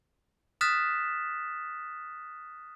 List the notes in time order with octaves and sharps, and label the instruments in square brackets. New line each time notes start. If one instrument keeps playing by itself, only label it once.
[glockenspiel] D#6 F6 F#6 A6 B6 E7